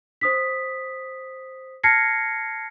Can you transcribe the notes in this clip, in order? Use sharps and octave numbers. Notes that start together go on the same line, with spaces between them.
C5 D#6 B6
A5 F6 G#6 A#6 C7 C#7